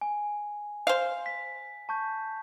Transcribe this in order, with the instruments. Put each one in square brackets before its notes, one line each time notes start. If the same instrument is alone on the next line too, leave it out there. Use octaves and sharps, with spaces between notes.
[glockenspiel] G#5
[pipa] C5 F5
[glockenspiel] B6
A5 C#6 G6